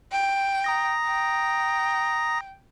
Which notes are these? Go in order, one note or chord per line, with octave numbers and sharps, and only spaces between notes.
G5
A#5 D#6 A#6
G5